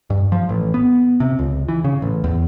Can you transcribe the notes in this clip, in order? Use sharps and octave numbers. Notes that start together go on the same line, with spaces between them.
G2
F3
A1
B3
C3
C#2
E3
C#3
A1
E2